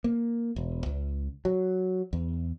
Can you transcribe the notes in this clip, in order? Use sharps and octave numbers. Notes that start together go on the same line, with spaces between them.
A#3
E1
C#2
F#3
E2